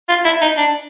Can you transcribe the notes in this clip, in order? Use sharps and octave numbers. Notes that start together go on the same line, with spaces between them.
F4
E4
D#4
D4